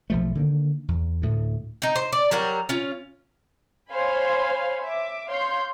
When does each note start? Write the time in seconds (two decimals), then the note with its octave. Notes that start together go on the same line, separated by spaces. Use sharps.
0.10 B1 F3 A3
0.35 D3 D#3 A#3
0.88 E2
1.22 D2 A2 A3
1.82 D#4 G5
1.96 C5
2.13 D5
2.31 F#3 G3 A#4 F#5
2.69 C#4 F4
3.91 C5 C#5 F5 G#5 B5
4.83 E5 D6
5.29 C#5 F5 C6 G6